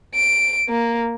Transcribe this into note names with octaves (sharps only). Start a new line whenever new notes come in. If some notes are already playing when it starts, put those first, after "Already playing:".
D7
A#3